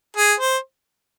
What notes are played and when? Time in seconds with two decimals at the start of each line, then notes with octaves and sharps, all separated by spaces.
0.16 G#4
0.40 C5